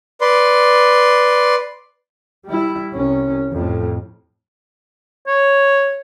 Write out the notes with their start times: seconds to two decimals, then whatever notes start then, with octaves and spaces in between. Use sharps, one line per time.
0.21 B4 D5 C6
2.46 G3 E4
2.94 C2 C#4
3.52 F2 A2
5.27 C#5